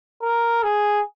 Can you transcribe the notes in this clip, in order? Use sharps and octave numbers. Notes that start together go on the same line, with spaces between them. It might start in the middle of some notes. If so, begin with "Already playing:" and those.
A#4
G#4